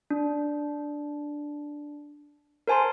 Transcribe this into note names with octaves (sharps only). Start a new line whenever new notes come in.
D4
A#4 C5 G#5 A5 C6